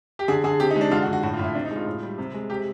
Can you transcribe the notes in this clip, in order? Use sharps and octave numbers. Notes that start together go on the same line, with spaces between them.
G4
D3 G#4
D3 G#4
C3 G4
D#4
G#3
D4
D3 F4
F#4
D3
F#4
A2 F#4
F4
A2 E4
C3 D4
D#4
G#3
F4
A2
G3
C3
G#3
C3 G4